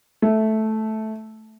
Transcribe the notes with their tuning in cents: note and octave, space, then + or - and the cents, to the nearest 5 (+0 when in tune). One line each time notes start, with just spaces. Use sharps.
A3 -10